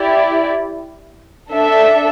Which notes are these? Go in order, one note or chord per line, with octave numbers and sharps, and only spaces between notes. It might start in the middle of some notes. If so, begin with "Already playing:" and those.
Already playing: E4 G4 D5
D4 A4 E5